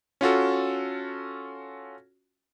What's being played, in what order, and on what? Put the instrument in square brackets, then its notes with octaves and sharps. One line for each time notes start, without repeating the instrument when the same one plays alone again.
[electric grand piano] C#4 F4 F#4 A4